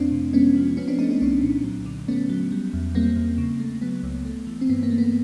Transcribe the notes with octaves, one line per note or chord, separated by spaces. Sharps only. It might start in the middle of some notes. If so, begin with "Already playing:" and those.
Already playing: F2 A3 C4 D4
C3
G#3 B3 C#4
F3
F3 B3 C#4
C4 D4
A3 C#4 D#4
C#4 D#4
C2 C4 D4
A#2
F#3
D3
A3 B3 C#4
F#3
G3
E2
G3 A#3 C4
E2
C#3
A3
F#3 B3
C#2
A3
E3
C4
G2 B3
A#3
A3
B3